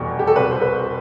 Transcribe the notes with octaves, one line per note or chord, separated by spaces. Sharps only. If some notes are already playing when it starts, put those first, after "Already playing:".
Already playing: F1 E2 B2 G3 G4
G4
A4
C2 B2 G3 B4
C5
B4